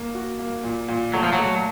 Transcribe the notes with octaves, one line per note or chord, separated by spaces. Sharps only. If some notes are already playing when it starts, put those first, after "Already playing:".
Already playing: A#3
F#4
A#3
A#2
A#2
F#3 A3
F3
F#3
A3